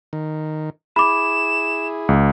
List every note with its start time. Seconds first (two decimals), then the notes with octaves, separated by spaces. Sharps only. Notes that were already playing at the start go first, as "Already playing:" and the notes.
0.13 D#3
0.96 E4 G#4 B5 D6 E7
2.09 C#2